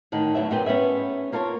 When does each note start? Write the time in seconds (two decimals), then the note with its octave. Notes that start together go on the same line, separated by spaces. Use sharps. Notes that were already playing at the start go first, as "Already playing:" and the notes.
0.12 A2 D3 D#3
0.35 D2 A2 C#3 F#3 E5
0.50 F#2 A#2 B3 G#4 G5
0.66 B3 C#4 G#4 E5
1.32 A#3 F4 A4 A#4 C#5